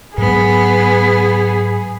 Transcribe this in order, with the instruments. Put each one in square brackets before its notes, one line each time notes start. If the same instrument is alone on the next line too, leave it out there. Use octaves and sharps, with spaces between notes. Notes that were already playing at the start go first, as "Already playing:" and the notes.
[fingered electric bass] G#2 F#3 G#3 [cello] B3 [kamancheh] G#4